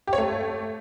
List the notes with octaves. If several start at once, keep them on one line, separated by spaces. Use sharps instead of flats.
G4
C#5
A3